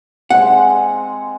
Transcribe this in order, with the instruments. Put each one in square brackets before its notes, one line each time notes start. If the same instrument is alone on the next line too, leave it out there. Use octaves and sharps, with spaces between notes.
[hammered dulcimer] G#3 C4 [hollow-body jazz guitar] F#5